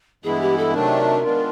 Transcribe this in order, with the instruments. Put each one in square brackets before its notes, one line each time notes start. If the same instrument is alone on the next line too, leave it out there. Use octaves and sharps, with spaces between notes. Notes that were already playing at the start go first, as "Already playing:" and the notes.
[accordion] G2 E3 G#3 B3 E4 [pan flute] G#4
[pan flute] G4
A4
[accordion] C3 D#3 F#3 A3 D4 [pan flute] A#4
[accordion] D#3 G#3 B3 D4 F4